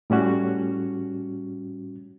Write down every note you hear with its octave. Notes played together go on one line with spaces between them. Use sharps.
A2 G3 C#4 F#4